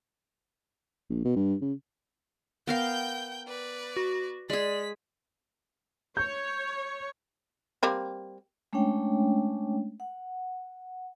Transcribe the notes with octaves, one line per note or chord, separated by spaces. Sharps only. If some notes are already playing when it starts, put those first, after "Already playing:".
A#1
B2
G2
C#3
B3 A#4 F5 G5 G6
B4 D5
F#4
G#3 G#4 D5 B6
C#5 G6
G3 A#3 C4
G#3 A3 C#4 D4 C#5 G5
F#5